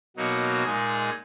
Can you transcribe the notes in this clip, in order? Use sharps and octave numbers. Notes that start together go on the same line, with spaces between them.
B2 F#3 A#3 D#4 F#4
A#2 G#3 D#4 G#4